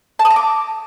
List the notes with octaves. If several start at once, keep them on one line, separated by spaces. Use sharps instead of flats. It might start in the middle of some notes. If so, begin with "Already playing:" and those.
A5
D#6
A#5
D6